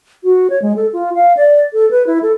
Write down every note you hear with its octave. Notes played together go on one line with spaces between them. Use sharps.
F#4
C#5
G#3
A4
F4
F5
D5
A4
B4
E4
A4